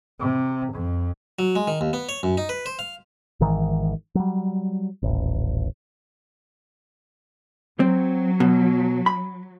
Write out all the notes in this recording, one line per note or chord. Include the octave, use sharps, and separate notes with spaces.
C3
F2
F#3
G#3
D#3
D#2
B3
C#5
F#2
D#4
B4
C5
F5
G#1 G#2 D#3 E3
F#3 G3
D#1 A1
F#3 C4
B2
B5